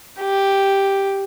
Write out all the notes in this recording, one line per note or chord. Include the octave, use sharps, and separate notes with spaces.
G4